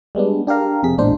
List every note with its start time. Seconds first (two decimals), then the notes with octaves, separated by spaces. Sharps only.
0.15 G3 G#3 B3 D4
0.47 D4 G4 A#4 F5 A#5
0.83 F2 C3 G#4 B6
0.97 A1 E2 A#2 G#3 D4 C5